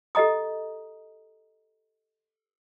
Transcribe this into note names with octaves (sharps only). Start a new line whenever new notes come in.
G4 A4 D#5 A#5 D#6